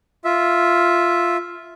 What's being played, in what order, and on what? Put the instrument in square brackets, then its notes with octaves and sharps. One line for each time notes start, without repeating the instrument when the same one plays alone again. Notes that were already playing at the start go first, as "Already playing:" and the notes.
[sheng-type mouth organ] F4 E5